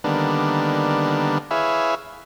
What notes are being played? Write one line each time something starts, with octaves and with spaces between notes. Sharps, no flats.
D3 D#3 G3 A#3 B3 D4
E4 G#4 B4 C#5 E5 F5